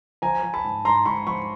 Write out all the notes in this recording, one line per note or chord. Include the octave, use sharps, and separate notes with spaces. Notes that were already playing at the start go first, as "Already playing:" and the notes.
F3 G#5 A#5
F3
A5 B5
G#2
G#2 A#5 C6
G#2 B5 C#6
F3 B5 C#6